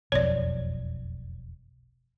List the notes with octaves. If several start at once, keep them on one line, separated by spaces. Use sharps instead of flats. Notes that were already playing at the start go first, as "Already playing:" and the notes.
E1 B1 F2 C#5 D5